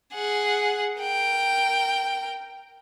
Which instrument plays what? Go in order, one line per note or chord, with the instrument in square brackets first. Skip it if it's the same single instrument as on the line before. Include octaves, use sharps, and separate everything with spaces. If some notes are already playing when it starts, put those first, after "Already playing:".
[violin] G#4 F#5
A#4 G5